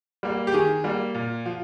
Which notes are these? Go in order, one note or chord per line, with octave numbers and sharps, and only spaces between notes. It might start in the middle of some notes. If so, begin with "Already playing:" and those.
G3 A#3
G4
D#3 G#4
G3 A#3
A#2
F3